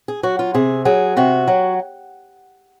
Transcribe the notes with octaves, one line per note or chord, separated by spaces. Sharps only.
G#4
F#3 F#4
F4
C3 G#4
F#3 G#4
C3 F#4
F#3